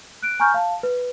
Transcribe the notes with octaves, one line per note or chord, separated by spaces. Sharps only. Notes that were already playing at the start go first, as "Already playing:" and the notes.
F#6 D7
G#5 A#5 C#6 F6 G6
F5 A5
B4